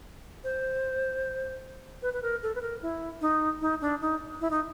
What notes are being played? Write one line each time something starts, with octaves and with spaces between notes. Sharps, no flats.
C5
B4
B4
A#4
A4
B4
A#4
E4
D#4
D#4
D4
D#4
E4
D#4